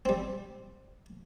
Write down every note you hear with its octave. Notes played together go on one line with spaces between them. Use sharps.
G3 C4